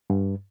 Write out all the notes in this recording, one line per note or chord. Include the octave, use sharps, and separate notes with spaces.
G2